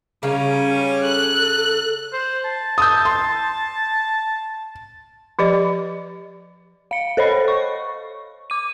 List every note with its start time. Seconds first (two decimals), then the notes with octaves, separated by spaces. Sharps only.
0.23 C#3 G3 C#4 A#4 F5
1.04 A4 F#6
2.13 C5
2.45 A5
2.78 D#6 E6 G6
3.05 C6
5.39 F3 G4 D5 D#5
6.91 F5 C#7
7.17 A4 C5 C#5 D#5 B5
7.48 C#6
8.50 D6 D#7